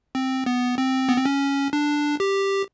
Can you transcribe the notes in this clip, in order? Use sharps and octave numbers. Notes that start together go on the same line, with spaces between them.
C4
B3
C4
B3
C4
C#4
D4
G4